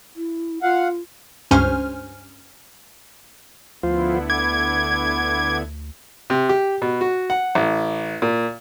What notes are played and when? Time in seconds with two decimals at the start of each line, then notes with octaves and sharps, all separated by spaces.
0.16 E4
0.63 F4 F5 F#5
1.51 C#2 G2 C#4 C5 G#5 F6
3.83 D2 D3 F3 B3 E4 F4 C5
4.30 D6 G#6
6.30 C3
6.49 G4
6.82 B2
7.01 F#4
7.30 F#5
7.55 A1
8.22 A#2